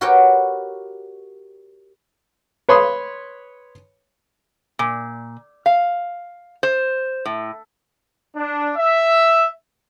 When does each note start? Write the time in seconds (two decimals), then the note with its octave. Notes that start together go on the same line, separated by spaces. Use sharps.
0.01 F#4 G4 A#4 B4 C#5 G5
2.69 B4 C#5 B5 C6 D#6
4.79 A#2
5.66 F5
6.63 C5
7.25 A2
8.35 D4
8.77 E5